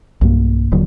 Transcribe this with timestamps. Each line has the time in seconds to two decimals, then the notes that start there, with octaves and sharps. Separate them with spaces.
0.21 B1 G2 A#3
0.72 D#1 D#2 D3 F#3